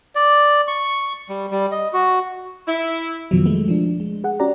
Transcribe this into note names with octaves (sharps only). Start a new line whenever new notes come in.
D5
C#6
G3
G3
D#5
F#4
E4
F2 B2 D#3 F3 F#3
G#3 A3
F3 D4
G#3
G#4 F#5
C#4 F#4 G4 D5 F#5 A#5